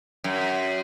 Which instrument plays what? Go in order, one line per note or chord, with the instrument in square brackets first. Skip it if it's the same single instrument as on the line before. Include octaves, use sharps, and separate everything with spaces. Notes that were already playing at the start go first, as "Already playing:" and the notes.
[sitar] F#2